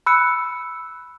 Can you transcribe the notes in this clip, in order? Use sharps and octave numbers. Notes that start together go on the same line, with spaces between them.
B5 E6 F#6 C#7